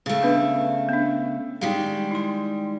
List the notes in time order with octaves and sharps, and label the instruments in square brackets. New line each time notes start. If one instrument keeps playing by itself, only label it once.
[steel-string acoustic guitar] C#3 A3
[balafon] B3 D4 B4
B3 D4
[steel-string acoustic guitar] D#3 G3 G#3 [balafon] F5
[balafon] E4 C6